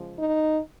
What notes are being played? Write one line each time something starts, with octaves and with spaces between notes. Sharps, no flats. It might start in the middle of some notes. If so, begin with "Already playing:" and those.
Already playing: C#3 F3 G#3
D#4